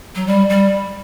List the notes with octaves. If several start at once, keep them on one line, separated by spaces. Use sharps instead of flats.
F#3
G3
G3